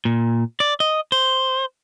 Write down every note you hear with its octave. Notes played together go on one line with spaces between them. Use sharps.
A#2
D5
D#5
C5